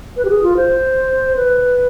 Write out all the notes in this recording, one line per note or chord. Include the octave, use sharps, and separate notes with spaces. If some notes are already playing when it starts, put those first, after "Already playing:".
B4
G4
G#4
F4
C5
B4